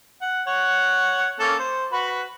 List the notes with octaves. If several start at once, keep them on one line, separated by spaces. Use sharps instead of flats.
F#5
C#5 F#5
A#3 C#4 A4
C5
F#4 B4 B5